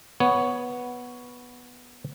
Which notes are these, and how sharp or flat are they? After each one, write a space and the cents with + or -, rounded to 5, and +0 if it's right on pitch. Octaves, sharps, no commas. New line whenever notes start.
B3 -5 C#5 +10